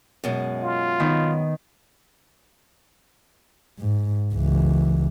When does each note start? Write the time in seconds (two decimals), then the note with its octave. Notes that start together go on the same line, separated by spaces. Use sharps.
0.24 F#2 B2 G#3
0.63 F4
1.00 D#3 B3
3.79 G#2
4.34 C#2 E3